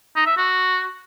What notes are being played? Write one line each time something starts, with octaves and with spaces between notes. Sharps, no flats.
D#4
E5
F#4